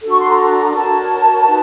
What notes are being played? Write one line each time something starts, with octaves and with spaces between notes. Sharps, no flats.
D4 F#4 A4
C#6
C6
A#5
F#4 A#4 C#5 A5
D#4 F#4 B4